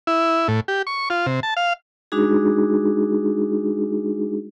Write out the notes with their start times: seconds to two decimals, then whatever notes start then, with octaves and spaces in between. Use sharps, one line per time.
0.07 E4
0.48 A2
0.68 G4
0.87 C#6
1.10 F4
1.26 C3
1.43 A5
1.57 F5
2.12 G#3 D4 D#4 F#4 G#4